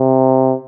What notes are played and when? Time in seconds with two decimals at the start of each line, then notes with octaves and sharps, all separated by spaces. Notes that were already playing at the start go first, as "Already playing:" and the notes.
Already playing: C3